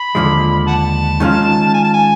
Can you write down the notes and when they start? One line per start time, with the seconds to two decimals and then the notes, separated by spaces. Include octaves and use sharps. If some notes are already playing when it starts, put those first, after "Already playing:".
Already playing: B5
0.15 D#2 D3 F3 G#3
0.68 F#5 A5
1.20 D#3 G#3 C#4 F4
1.74 G#5
1.84 A5
1.94 G#5